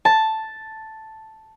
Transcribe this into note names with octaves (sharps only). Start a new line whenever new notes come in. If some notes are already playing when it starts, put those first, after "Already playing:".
A5